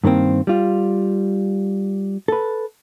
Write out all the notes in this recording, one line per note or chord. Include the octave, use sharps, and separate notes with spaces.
G2 D#3 A#3 C4
G3 F4
A4 B4